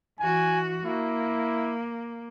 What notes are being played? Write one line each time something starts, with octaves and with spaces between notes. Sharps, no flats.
E3 F#4 G#5
A#3 E4